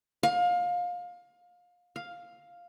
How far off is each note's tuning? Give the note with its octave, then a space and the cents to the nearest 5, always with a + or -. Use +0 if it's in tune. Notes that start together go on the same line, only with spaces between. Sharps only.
F5 +25
F5 +5